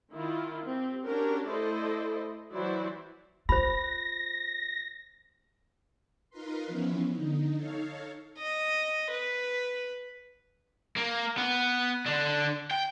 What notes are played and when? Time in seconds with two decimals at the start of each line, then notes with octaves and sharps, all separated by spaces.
0.13 D#3 E4 F4
0.66 C4 G4
1.05 C#4 D4 F#4 G4 A#4
1.49 A3 E4 A4 C5 D5 D#5
2.53 E3 F#3 E4 F#4 C5 D5
3.49 F4 C5 B5 A#6
6.30 D#4 F4 A#4 B4 C6
6.67 E3 F3 B3 C#4 E4
7.13 D3 D#4
7.54 D#4 A4 C#5 F5
8.38 D#5
9.10 B4
10.96 A#3
11.37 B3
12.06 D3 D4
12.71 G5